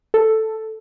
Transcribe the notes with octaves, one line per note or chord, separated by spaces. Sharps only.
A4